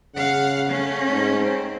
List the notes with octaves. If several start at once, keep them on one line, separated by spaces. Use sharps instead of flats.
C#3 F5 F#5
A3 C#4
G#2
C4